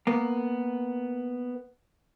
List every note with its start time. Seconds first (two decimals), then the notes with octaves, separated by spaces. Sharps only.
0.07 A#3 B3